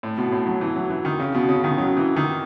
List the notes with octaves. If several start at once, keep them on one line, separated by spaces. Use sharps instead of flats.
A2
B2
A2
F#3
E3
F#3
E3
D#3
C#3
B2
C#3
D#3
F#3
E3
D#3